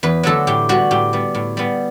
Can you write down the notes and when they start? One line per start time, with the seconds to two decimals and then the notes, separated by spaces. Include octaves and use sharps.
0.03 E2 B4
0.23 D3 F#3 A3 A4
0.47 A2 G4
0.69 G3 B3 F#4
0.91 A2 G4
1.13 G3 B3
1.35 A2
1.57 G3 B3